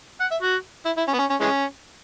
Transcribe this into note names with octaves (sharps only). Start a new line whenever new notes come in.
F#5
E5
F#4
E4
E4
C#4
B3
C#4
C#4
E3 G#3 C#4